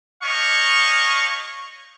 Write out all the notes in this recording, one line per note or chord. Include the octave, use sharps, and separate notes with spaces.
D4 G4 C#5 D#5 F5 C#6